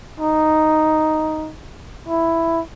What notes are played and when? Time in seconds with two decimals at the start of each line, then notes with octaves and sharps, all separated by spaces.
0.20 D#4
2.08 E4